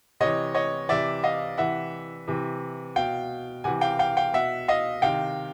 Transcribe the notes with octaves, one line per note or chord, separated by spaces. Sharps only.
C3 E3 C#5 D#5
C#5 D#5
C3 E3 D5 E5
D#5 F5
C3 E3 E5 F#5
C3 E3
B2 F5 G5
C3 E3 F#5 G#5
F5 G5
F5 G5
F5 G5
B2 E5 F#5
D#5 F5
C3 D#3 F5 G5